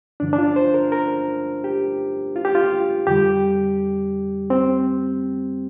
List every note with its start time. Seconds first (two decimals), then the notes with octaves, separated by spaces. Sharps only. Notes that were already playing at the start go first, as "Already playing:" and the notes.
0.20 G2 D3 F3 D4
0.33 D4
0.38 F4
0.56 C5
0.74 A#4
0.92 A#4
1.64 G4
2.36 F4
2.45 G4
2.55 F4
3.07 F2 D3 G3 G4
4.50 C4